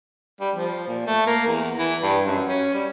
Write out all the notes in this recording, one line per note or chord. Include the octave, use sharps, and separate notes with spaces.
G3
F3
A#2
A3
A#3
E2
E3
G2
F#2
C#4
G3